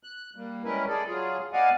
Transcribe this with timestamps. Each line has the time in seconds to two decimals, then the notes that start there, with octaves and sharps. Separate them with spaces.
0.03 F#6
0.36 G3 A#3
0.64 G3 G#3 C#4 E4 A#4 B4
0.88 G#4 A4 D5
1.07 F#3 F4 G#4
1.53 B3 D5 D#5 F5 F#5 G#5